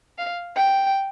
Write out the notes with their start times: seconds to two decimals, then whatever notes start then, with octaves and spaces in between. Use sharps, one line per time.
0.17 F5
0.55 G5